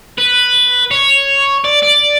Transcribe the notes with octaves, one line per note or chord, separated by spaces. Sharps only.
B4
C#5
D5
D5